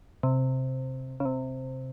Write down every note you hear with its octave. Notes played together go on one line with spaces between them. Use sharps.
C3
C#3
C3